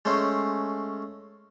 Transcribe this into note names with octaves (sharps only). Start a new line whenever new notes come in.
G#3 A3 C#4 C5